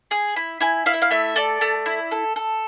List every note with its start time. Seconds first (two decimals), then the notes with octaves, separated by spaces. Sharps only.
0.11 G#4
0.36 E4
0.61 E4 G#5
0.86 E4 F5
0.94 E5
1.02 F5
1.11 A3 E5
1.36 A4 D5
1.61 A3
1.86 E4
2.11 A4
2.36 A4